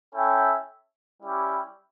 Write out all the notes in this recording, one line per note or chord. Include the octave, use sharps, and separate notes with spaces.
C#4 E4 A4 E5 G5
G3 C#4 E4 G4